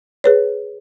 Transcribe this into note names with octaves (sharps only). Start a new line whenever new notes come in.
G#4 B4 C#5